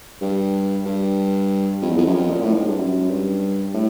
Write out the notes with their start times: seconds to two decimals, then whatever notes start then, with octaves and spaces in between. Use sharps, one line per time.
0.21 G2
0.85 G2
1.82 F2
1.90 E2
1.98 F2
2.06 F#2
2.14 F2
2.30 A#2
2.42 A2
2.54 G#2
2.66 G2
2.78 F#2
3.10 G2
3.74 A2